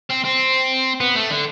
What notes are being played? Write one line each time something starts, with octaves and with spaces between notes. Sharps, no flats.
C4
C4
B3
A3
D3